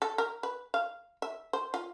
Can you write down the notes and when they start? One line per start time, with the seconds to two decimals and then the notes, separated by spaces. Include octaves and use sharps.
0.02 A4
0.18 A#4
0.43 B4
0.74 F5
1.22 E5
1.53 C5
1.74 F4